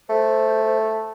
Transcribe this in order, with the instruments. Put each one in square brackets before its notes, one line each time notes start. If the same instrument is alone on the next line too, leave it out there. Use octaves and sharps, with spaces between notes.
[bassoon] A3 [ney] C5